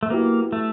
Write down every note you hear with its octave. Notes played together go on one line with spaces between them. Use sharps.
A3
F#3 A#3 B3 E4 G4
A3